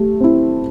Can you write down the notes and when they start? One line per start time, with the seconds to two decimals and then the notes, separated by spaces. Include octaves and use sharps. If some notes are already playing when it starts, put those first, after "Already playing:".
Already playing: A3 G4
0.21 C4 E4